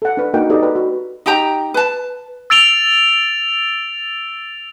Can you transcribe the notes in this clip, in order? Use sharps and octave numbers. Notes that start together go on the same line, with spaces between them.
A4 F#5
D4 B4
A#3 D#4 F#4 A#4 F#5 G5
D#4 G4 A4 B4 D5 D#5
B4 D5 G5 A#5
F#4
D#4 G4 G5 A#5
B4 A5
E6 A6 D7 F7 G7